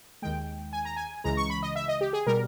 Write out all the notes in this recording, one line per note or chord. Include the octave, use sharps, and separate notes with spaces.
D#2 D#3 G#3 G5
G#5
A#5
G#5
C#2 C#3 E3 G#3 A#5
C#6
B5
D#5
E5
D#5
G4
G#4
B2 G3 A#4